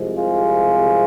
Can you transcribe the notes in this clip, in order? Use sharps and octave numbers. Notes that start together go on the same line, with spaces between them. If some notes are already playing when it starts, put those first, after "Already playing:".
Already playing: C2 C3 F3 G#3
F4 G#4